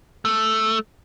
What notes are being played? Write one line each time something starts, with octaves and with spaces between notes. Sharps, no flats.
A3